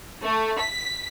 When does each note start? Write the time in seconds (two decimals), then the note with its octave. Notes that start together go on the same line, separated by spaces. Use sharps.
0.22 A3
0.60 B6